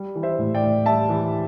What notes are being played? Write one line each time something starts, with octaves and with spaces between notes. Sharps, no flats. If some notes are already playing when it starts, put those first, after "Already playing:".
Already playing: G3
E3
C5 E5
A2
D5 G5
A2
G3 E5 A5
E3